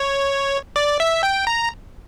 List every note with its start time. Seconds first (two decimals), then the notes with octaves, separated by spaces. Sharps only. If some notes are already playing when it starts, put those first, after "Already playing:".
Already playing: C#5
0.76 D5
1.00 E5
1.23 G5
1.47 A#5